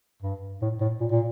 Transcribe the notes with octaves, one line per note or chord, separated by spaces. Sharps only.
G2
A2
A2
A#2
A#2